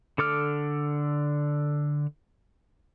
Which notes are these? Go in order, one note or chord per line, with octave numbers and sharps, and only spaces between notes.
D3 A4 D6 F6